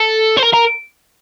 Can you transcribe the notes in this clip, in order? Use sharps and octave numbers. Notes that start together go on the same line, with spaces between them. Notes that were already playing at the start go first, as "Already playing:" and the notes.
Already playing: A4
C5
A#4
A#4